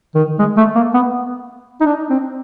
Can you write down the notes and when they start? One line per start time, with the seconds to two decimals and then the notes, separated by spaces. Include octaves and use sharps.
0.15 D#3
0.39 G#3
0.57 A3
0.75 A#3
0.94 B3
1.81 D#4
1.86 D4
2.10 C4